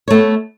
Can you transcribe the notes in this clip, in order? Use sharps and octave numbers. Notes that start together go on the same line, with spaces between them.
A3 B3 C#5